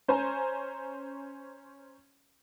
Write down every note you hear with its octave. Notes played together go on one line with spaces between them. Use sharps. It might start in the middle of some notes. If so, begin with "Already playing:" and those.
C#4 C5 C#5 G#5 A#5